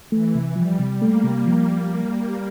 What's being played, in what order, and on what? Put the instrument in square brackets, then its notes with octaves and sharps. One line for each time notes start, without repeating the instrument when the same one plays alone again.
[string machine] E3 [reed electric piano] A3
[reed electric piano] C3
[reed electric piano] F3 [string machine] G3
[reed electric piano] C3
[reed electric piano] A3 [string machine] A#3
[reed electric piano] C3
F3